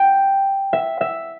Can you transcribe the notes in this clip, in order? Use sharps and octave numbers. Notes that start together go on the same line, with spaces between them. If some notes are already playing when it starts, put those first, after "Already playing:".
Already playing: G5
E5
E5